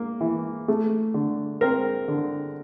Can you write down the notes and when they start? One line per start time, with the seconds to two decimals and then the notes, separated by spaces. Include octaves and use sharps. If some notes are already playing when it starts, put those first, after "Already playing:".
Already playing: A#3
0.20 E3
0.68 A3
1.14 D3
1.61 C4 A#4
2.08 D3